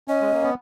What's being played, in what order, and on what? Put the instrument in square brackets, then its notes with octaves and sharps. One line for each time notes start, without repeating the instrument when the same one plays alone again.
[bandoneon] C#4 [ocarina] D#5
[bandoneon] G#3
A#3
B3